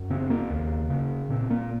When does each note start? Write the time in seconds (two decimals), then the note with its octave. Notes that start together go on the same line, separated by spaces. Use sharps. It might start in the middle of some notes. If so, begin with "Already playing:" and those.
Already playing: F#2
0.10 C#3 C4
0.30 A#3
0.50 D#2
0.90 C#3
1.30 A#2 C4
1.50 A#3